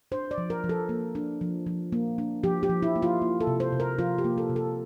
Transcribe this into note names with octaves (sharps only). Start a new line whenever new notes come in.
D4 C5
D5
F3
A#4
F3
A4
A#3
D4
F3
F3
A#3
D4
F3 G4
G4
F3
E4
A#3
F4
A#3
A4
C3
C5
C3
A#4
F3 F4
G4
A#3
A4
C3
A4